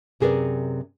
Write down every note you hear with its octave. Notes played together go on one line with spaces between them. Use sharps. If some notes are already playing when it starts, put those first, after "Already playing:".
F#2 C3 G#4 A#4 B4 D5